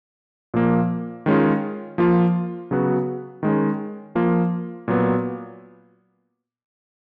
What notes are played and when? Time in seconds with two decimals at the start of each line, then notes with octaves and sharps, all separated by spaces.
0.54 A#2 F3 A#3
1.26 D#3 G#3 C#4 F4
1.98 F3 A#3 F4
2.71 C#3 F#3 B3 F#4
3.43 D#3 G#3 C#4
4.15 F3 A#3 F4
4.88 A#2 F#3 B3